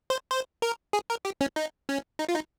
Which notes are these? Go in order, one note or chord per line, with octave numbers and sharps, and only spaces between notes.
C5
C5
A#4
G#4
A#4
G4
C#4
D#4
C#4
D#4
F4
D#4